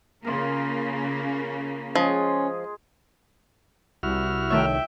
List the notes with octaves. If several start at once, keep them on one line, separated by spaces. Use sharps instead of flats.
C#3 A#3 F4 A#4
F3 G#3 C#4 G#4
C2 E4 F#4 F6
D#3 A3 C#5 E5 G5